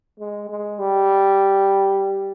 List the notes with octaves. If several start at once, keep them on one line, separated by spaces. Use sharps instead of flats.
G#3
G#3
G3